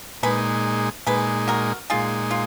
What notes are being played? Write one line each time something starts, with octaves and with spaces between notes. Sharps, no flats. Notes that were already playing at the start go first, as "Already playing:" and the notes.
A#2 G#3 D#4 G#4 B4
A#2 G#3 D#4 G#4 B4
F#4 A#4
A#2 G#3 D#4 F4 G#4
F4